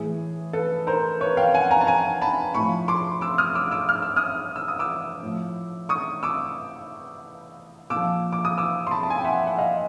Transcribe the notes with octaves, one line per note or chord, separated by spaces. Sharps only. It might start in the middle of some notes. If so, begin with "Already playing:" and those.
Already playing: A2 E3 G#4
A4 B4
A#4 C5
B4 C#5
F5 G5
F#5 G#5
G#5 A#5
A5
G#5 A#5
A5 B5
A2 F3 B5 C#6
C6 D6
D6 E6
D#6 F6
D6 E6
D6 E6
F6
E6
D#6 F6
E6
D#6
D6 E6
A2 F3
C#6 D#6
D6 E6
A#2 F3 D6 E6
D6
D#6
D6 E6
C6
A5 B5
A5
G#5
G5
E5 F#5
F#5
D#5 F5